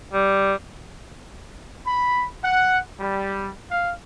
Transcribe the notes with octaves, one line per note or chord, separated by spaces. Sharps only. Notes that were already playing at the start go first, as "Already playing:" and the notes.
G3
B5
F#5
G3
F5